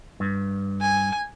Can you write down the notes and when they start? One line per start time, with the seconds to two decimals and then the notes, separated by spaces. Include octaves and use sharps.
0.20 G2
0.81 G#5